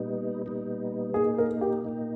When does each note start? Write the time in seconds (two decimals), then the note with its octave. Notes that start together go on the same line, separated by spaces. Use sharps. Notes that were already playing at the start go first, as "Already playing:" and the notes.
Already playing: A#2 G3 B3 D#4
0.46 A#2 G3 B3 D#4
1.14 A#2 A#3 D#4 G#4
1.38 A#4
1.61 G4
1.85 A#2 A#3 D#4